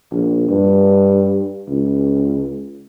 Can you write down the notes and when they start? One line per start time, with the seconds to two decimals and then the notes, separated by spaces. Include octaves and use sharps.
0.11 A#1
0.49 G2
1.69 C#2